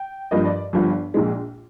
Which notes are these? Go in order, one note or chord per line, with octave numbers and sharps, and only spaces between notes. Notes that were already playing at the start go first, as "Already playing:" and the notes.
Already playing: G5
G2 F3 A#3 D#5
D5
G1 G2 F3
A#1 A#2 G#3